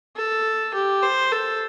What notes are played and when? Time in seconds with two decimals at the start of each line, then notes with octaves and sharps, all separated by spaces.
0.16 A4
0.74 G4
1.03 C5
1.32 A4